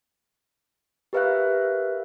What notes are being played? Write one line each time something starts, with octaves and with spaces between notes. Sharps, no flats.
G4 A#4 B4 E5 F5 F#6